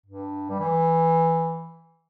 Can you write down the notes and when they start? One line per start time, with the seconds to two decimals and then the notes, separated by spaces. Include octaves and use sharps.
0.06 G2
0.50 G3
0.59 E3